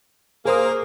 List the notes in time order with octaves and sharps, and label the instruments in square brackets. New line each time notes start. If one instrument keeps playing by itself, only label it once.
[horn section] A#3 [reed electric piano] G#4 C5 D#6